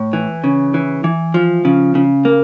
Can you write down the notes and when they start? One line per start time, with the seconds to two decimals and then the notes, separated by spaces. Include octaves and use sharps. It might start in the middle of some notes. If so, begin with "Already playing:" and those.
Already playing: A2
0.13 E3
0.44 C#3
0.74 E3
1.04 E3
1.34 F3
1.65 C#3
1.95 C#3
2.25 A#3